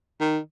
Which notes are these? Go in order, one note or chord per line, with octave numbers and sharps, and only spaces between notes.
D#3